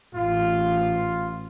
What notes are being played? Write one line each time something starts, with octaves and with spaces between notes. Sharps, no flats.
A1 F4